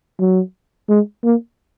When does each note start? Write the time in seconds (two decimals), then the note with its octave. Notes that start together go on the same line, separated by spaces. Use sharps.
0.19 F#3
0.89 G#3
1.24 A#3